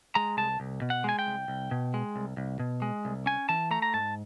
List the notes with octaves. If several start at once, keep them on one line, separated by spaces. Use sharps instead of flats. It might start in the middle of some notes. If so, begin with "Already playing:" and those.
G#3 A#5
C2 A5
C2
B2
F#5
G#3 G#5
G5
C2
C2
B2
G#3
C2
C2
B2
G#3
C2
C#4 G#5
E3 A5
A3 A#5
A#5
G#2 A5